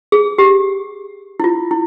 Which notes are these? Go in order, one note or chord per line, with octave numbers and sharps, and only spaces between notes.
G#4
G4
E4
F4
E4